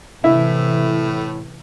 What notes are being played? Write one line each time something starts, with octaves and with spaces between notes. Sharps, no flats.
A2 C3 E3 E4